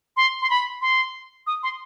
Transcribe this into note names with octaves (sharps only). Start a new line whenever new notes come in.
C6
C6
B5
C6
D#6
C6